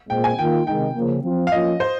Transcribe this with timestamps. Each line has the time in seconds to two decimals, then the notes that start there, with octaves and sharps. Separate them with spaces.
0.09 A#2 G#3 C4 G5
0.24 G#5
0.38 D#3 A#3 F4 G5
0.67 C3 D#3 G#3 D#4 G5
0.95 C#3 F3 A#3
1.23 F3 C4 F4
1.47 F5
1.52 F3 A#3 C#4 F4 D#5
1.80 C5